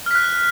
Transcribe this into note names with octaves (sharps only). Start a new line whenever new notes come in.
F6 F#6 B6